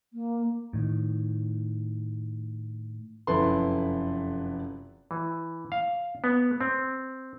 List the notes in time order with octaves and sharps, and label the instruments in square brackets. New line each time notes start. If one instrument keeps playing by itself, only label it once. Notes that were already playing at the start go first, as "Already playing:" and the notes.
[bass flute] A#3
[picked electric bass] A2 D#3
[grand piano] F1 F#2 E4 A4 B4 C6
[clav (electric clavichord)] E3
F5
B3
C4